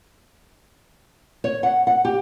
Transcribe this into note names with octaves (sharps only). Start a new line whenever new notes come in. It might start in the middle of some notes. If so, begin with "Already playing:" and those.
C#5
F#5
F#5
G4